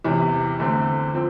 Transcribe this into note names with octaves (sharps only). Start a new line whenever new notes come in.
E2 C3 E3
E2 D3 A3 C4
F3 C4